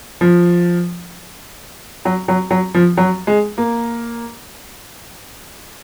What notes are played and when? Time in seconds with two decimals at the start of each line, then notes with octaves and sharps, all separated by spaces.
0.21 F3
2.05 F#3
2.28 F#3
2.51 F#3
2.74 F3
2.97 F#3
3.27 G#3
3.58 A#3